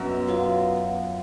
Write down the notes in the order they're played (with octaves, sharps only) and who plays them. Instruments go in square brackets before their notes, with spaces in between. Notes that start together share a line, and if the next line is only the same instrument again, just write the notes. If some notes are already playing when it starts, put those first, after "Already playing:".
Already playing: [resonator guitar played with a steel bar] F#2 [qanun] B2
[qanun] F#3 B3 F4